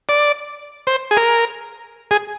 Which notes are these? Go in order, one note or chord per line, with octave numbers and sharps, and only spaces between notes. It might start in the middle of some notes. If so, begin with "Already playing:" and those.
D5
C5
G#4
A#4
G#4